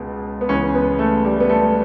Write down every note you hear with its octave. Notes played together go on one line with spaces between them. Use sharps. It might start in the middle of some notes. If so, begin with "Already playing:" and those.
Already playing: C#2 B2
B3
C#2 C#3 E3 C#4
B3
A3
G3
B3
A3